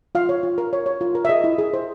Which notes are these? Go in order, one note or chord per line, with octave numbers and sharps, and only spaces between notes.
F4 F5
C#5
F4
A#4
C#5
C#5
F4
A#4
E5
G#4 D#5
E4
G#4
C5